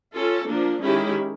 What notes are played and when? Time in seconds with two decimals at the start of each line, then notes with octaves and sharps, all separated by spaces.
0.15 C#4 F4 A4
0.49 F3 A#3 D4
0.82 D#3 G#3 C#4 E4 G4